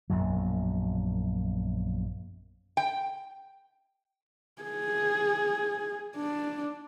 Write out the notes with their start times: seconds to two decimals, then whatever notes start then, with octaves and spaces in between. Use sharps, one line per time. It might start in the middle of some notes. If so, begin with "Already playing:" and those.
0.10 A#1 F#2 B2 F#3
2.77 G5
4.62 G#4
6.16 D4